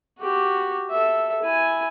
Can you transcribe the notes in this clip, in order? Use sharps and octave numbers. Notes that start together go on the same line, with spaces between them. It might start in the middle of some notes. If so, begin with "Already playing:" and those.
F#4 G4
A4 E5
E4 G#5